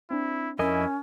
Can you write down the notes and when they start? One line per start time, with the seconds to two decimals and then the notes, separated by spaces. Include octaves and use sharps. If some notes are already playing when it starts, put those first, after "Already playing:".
0.10 C4 D4 E4
0.59 F2 C#4 E4 A#4 D#5 G#5